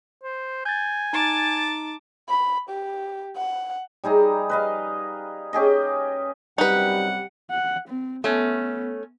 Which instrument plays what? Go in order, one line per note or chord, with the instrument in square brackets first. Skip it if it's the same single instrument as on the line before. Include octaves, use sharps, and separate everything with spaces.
[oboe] C5
[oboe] G#5 [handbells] G6 A6
[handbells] D#4 [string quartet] A5 D6 A6
[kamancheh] B5
G4
F#5
[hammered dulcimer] G3 D#4 G#4 A#5
B4 D#5 F5
C#4 G4 G#4 D#5
[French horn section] F#2 C3 G3 [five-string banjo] D#4 B4 [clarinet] F#5
[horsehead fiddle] F#5
C4
[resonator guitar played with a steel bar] A3 C#4 [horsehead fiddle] B3